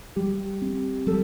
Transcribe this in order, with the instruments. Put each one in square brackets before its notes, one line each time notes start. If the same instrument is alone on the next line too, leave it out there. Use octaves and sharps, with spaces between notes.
[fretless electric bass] G3 [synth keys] G4
[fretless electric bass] C4
[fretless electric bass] G3 [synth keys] A4